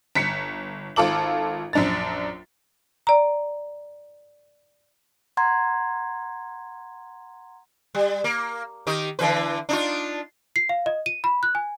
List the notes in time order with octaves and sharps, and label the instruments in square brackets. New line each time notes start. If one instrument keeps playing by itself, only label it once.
[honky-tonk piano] G1 B6 C#7
G#1 F4 A4 D6 F#7
A#1 F#2 D4 A#5 A6
[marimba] D5 A#5
[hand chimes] F#5 A#5 C6 G#6
[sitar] G3
A#3
D#3 G4 D#5
D3 E3 B4
D4 D#4 F4
[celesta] C7
F5
D#5
D#7
B5
F#6
G#5